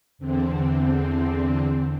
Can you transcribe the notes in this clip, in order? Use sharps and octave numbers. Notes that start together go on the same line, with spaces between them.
E2 D3 C4